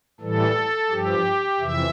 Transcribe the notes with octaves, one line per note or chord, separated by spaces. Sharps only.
A2 E3 G3 A4
G2 F3 G4
F2 C3 E3 E5